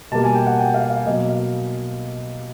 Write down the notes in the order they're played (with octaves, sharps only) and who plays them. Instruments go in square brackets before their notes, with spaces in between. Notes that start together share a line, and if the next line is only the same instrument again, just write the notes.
[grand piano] B2 G3 A#3 A5
G#5
G5
F#5
G5
F5
F5
B2 F#3 A#3 D#5
F5